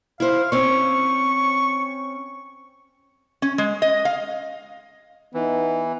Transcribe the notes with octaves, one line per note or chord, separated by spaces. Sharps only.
E4 C5 F5
C4 C#4 C#6
C#4
G#3
D#5
F5
E3 B3 D#4